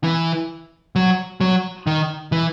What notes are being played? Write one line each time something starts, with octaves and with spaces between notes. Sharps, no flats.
E3
F#3
F#3
D#3
E3